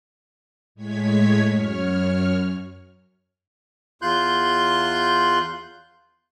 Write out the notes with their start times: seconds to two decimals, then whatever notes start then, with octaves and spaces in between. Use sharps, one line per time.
0.75 A2 G#3 C#5 G#6 B6
1.48 F#2 C#5 F6
4.02 E2 F4 C6 F#6 G6